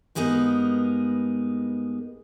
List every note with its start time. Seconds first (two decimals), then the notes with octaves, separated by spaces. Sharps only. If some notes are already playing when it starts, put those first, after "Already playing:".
0.15 G2 G#3 A#3 B3 D#4